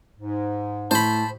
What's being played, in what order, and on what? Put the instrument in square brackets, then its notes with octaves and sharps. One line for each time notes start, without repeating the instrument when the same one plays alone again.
[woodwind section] G#2
[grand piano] A2 [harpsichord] C5 B5 [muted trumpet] A5